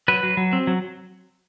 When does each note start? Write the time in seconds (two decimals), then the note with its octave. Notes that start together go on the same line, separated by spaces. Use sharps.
0.08 F#3 B4
0.23 F#3
0.37 F#3
0.53 C4
0.67 F#3